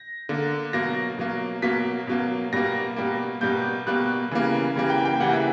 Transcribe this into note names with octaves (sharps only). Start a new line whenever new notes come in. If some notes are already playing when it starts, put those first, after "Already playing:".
Already playing: A#6
D3 A#3
B2 F#3 A#3 A#6
B2 F#3 A#3
B2 F#3 A#3 B6
B2 F#3 A#3
B2 G3 A#3 A#6
B2 G3 A#3
B2 G3 A#3 G6
B2 G3 A#3 F#6
C#3 E3 G3 A#3
C#3 E3 G3 A#3
G5
G5
C#3 E3 G3 A#3 F#5
E5